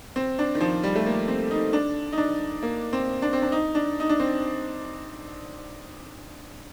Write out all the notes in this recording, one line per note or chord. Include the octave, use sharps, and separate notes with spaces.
C4
D4
D#3
F3
G3
A3
A#3
C4
D#4
D4
D#4
D4
A#3
C4
D4
C4
D4
D#4
D4
D#4
D4
C4